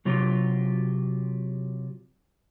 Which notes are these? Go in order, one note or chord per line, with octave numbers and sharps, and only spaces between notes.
C3 F#3 F4 G4